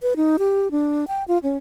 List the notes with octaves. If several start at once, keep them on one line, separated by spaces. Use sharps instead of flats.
B4
D#4
G4
D4
G5
F4
C#4